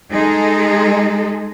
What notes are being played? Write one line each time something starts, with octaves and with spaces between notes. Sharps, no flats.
G#3 D#4 G#4 A4